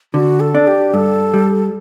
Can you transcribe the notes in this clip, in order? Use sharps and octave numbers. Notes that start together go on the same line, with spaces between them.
D3 F#4
A4
D4
G4
G2 A4
G3